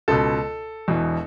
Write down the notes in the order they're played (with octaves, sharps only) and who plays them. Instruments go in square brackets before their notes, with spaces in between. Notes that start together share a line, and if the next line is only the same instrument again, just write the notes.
[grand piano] C#2 B2 A4
E1 E2 B2